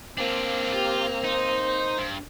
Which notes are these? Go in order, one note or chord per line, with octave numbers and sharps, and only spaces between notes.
A#3 C4 D4 F4
F4 G4
D#4 C5
G2